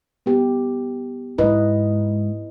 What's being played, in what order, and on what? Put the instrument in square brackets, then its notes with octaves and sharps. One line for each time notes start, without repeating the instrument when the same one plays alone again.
[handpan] B3 G4
[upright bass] G#2 [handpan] E4 B4 D#5